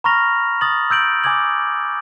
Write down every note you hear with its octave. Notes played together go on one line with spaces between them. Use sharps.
A#5 B5 C#6 F6 A#6 F7
D#6 A6 F#7
E6 G6 D7 F#7
G#5 D6 D#6 G#6 F#7